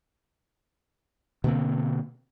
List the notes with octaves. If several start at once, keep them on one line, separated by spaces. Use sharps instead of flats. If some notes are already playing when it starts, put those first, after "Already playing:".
B2 D3 A#3 C4